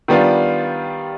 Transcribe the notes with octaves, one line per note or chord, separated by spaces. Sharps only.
D#3 G3 B3 D4 F4